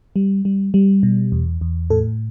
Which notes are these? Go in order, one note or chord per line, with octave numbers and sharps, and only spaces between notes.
G3
G3
G3
B2
E2
E2
A2 A4